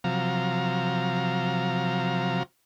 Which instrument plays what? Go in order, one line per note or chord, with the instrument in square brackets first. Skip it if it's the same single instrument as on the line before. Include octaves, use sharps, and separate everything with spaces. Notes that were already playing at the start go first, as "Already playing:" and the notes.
[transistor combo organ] C3 F3 F#3 F5 A#5